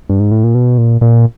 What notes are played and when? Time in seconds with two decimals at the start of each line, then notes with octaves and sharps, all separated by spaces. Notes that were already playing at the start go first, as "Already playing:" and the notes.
0.09 G2
0.20 G#2
0.32 A2
0.44 A#2
0.55 B2
0.78 A#2
1.01 A#2